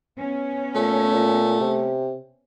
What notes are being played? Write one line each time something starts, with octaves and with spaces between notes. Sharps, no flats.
B3 C#4
A#2 A3
A#2
C3